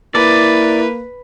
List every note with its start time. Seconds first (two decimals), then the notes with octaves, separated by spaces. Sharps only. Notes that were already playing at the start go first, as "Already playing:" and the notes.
0.15 A#3 E4 B4 D5